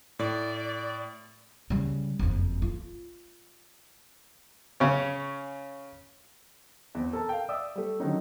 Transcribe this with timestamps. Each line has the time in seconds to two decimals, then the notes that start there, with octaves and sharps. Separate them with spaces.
0.19 A2 D5
1.70 C#3 G3
2.19 F#1 F2
2.62 F4
4.80 C#3 C#4
6.95 E2 C4
7.13 A4 A#4 A5
7.29 F5 G5
7.49 D5 E5 D#6 E6
7.76 G3 A3
8.00 D3 D#3 F#3 C#4 D#4